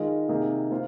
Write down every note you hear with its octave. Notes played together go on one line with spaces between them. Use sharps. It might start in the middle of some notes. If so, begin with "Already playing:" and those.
Already playing: D#3 G#3 F4
C3 D#3 A#3 G#4
A#3 F4 C5